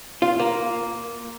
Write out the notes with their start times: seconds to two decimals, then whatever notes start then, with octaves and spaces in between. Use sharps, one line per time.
0.22 F4
0.40 A#3